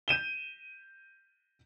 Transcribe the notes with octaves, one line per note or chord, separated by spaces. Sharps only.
G6 D#7 E7 G7